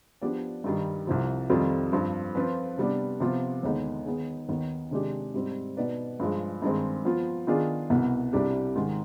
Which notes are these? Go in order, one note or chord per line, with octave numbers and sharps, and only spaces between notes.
F3 B3 D4 G4 D5
G2 D#3 G3
C2 C3 F3
F2 D#3 G3 C4 F4
G2 F3 C4
F3 C4 F4 B4
C3 G3 B3 D4
C3 F3 B3 F4
D#2 D3 G#3 B3 D#4
D#3 B3 D#4 G#4
D#2 D#3 B3
C3 D#3 G#3 D4 G4
G#2 G3 C4
B2 B3 D#4 B4 D5
G2 F3 G#3
G2 D#3 G#3 C4
F3 B3 F4
D#3 B3 D4 F4 G#4
C2 B2 B3
C2 C3 G3 D4 G4
G#2 D#3 G#3